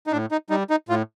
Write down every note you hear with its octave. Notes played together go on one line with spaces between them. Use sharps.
D#4
A2 D4
D#4
G3 D#4
D#4
A2 F4